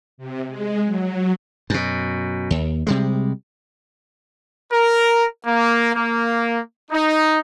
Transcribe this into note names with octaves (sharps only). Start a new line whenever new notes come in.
C3
G#3
F#3
F#2 B2
D#2
C3 G3 G#3
A#4
A#3
A#3
D#4